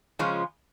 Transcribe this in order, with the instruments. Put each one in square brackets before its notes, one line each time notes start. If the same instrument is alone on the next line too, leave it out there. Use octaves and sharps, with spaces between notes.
[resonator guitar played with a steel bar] C#3 F3 G#3 C#4 F4